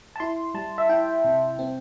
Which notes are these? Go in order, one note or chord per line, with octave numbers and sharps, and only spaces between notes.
A5
E4 C6
G3 A5
E5
E4 G5
C3
C4